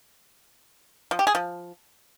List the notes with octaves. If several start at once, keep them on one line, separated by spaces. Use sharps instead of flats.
F3
G4
G#4
F3